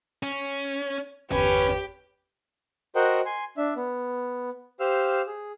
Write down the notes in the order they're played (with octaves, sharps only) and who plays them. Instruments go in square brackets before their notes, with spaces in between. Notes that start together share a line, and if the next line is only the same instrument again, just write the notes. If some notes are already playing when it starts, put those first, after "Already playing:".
[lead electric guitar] C#4
[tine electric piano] G1 E2 [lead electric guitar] C#4 [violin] G4 [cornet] B4
[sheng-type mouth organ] F#4 A#4 C5 D#5 F#5 G5
G#5 C6
D4 E5
B3
G4 C5 F5 E6 F6
G#4